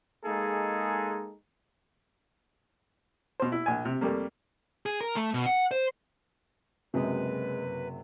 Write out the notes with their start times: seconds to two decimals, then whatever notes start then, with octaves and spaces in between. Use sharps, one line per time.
0.25 G#3 A#3 D#4 G#4 A4
3.40 B2 C5
3.52 E4
3.66 A#1 G#5
3.85 C3
4.01 F2 G3 A3 A#3
4.86 G#4
5.01 A#4
5.16 A3
5.34 B2
5.46 F#5
5.71 C5
6.94 F#1 F#2 C3 F#3 G#3 B4